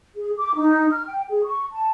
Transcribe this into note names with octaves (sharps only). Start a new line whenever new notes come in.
G#4
D6
D#4
F6
G5
G#4
C#6
A5